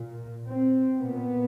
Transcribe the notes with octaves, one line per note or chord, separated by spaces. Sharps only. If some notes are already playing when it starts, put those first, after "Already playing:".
Already playing: A#2
C4
A#2 B3